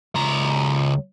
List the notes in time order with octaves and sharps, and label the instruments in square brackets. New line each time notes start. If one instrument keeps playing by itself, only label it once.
[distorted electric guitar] C#2 A#5